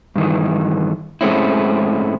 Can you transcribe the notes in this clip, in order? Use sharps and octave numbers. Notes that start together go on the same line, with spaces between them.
G2 D#3 E3
G#2 G#3 A3 C4 C#4 E4